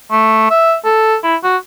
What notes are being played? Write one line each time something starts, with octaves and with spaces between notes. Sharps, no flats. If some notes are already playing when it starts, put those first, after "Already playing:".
A3
E5
A4
E4
F#4